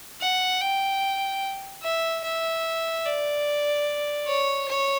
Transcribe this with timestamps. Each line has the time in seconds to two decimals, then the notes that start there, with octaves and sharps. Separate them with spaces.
0.21 F#5
0.61 G5
1.83 E5
2.24 E5
3.06 D5
4.27 C#5
4.68 C#5